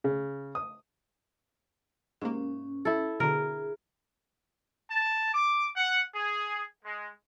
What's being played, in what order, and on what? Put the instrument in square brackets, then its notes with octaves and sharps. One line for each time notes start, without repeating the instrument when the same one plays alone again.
[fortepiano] C#3
D#6
[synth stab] G#2 C3 A#3 [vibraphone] C#4
[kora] E4 A4
[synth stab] B2 D3 [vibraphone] G#4 [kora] A#4
[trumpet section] A5
D6
F#5
G#4
G#3